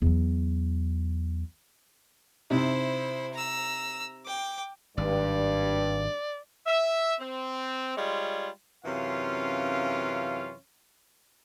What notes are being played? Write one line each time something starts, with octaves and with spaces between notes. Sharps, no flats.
E2 F#3
C3 C4 D#4 E4 C5
A#5 E6
G5 D6
G#1 G2 D5
E5
C4
G3 G#3 F4 C#5
F#2 C3 E3 C#4 F4 F5